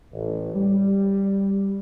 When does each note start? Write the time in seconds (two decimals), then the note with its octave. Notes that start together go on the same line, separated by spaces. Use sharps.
0.13 A1
0.55 G3